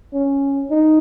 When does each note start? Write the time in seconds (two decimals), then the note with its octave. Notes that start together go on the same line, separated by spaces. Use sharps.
0.13 C#4
0.70 D#4